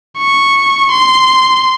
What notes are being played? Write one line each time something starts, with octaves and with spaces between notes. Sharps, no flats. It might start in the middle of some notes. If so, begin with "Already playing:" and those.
C#6
C6